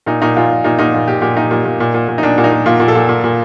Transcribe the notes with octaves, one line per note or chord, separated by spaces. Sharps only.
A#2 D#4
A#2 D#4
A#2 F4
A#2
A#2 D#4
A#2 D#4
A#2 F4
A#2 G4
A#2 G4
A#2 D#4
A#2
A#2
A#2
A#2
A#2
D#4
A#2 D4
A#2
D#4
A#2
A#2 F4
A#2
A4
A#2
A#2
A#2